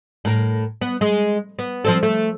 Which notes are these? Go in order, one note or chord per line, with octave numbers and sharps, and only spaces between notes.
A2 A#4
B3
G#3
B3
F3 C4 A4
A3